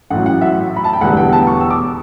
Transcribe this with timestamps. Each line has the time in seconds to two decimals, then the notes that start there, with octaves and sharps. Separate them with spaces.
0.10 A1 A2 F#3 F#5
0.26 F#5
0.41 E5
0.76 B5
0.84 A5
0.93 G5
1.01 E1 E2 D3 G3 B3 F#5
1.17 G5
1.33 A5
1.47 C#6
1.60 E6
1.71 D6